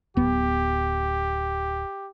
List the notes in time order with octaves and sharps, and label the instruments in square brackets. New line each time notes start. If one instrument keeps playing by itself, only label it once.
[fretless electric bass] D1 B3 [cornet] G4